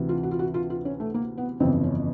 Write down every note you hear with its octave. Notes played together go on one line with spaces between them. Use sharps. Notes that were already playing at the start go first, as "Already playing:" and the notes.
Already playing: D2 C3 E3
F4
F#4
F4
F#4
F4
F4
C#4
A3
A#3
B3
G1 F2 C#3 E3 C4
C#4